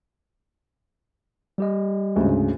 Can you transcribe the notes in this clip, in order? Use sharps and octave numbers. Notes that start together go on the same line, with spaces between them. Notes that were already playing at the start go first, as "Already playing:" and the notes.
G3 G4 D#5
D2 G#2 C#3